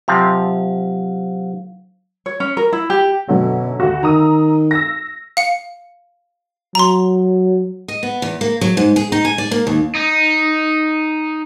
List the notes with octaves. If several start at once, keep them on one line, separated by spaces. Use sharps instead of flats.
C3 F3 F#3 C4 F5
C#5
C#4
A#4
E4
G4
F#2 B2 D3 F#3
D2 F#4
D#3 A#5 D#6 E6
E6 A#6
F5 C#7
F#3 A#5 C6
D#5
B3
E2
A#3
F#3
G#2
G#4
D#4
G#5
D5
A#3
D#2
D#4